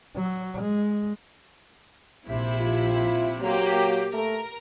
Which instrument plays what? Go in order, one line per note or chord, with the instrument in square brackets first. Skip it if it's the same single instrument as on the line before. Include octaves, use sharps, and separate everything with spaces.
[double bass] F#3
G#3
[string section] A#1 C3 E4
[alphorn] F4
[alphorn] F#3 [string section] A#3 G4
[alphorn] A3 [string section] A#4